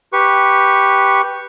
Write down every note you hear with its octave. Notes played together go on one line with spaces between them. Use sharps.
G4 B4 C#6